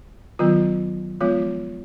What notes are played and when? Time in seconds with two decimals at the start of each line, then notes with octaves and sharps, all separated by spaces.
0.39 D#3 F#3 B3 F4
1.21 F3 G#3 B3 F4